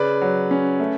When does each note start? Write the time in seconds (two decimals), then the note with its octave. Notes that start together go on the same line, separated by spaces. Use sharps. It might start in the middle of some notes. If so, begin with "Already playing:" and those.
Already playing: C#3 B4 D5
0.21 F#3
0.51 C#4
0.80 A3